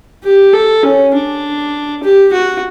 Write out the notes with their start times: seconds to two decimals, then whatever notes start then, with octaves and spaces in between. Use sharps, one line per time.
0.24 G4
0.54 A4
0.83 C#4
1.14 D4
2.03 G4
2.33 F#4